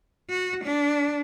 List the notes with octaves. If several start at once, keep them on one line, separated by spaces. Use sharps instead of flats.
F#4
D4